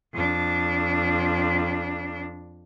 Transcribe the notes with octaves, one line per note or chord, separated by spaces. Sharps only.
F2 D4